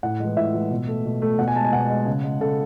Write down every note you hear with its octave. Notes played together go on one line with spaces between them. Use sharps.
A2 F#5
E3 G#3
A2 E5
E3 G#3
B2
A3
B2
A3
B2 F#5
G#5
G#3 A5
G#5
B2 F#5
G#3
C#3
G#3
C#3 A4